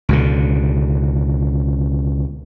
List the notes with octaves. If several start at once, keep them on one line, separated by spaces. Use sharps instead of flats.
C#2 B2 D3